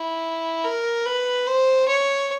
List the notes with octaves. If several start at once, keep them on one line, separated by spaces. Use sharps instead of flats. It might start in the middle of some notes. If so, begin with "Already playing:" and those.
Already playing: E4
A#4
B4
C5
C#5